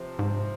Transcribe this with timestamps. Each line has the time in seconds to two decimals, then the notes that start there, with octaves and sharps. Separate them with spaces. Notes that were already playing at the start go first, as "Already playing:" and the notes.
Already playing: C3 F3 C4
0.19 G#2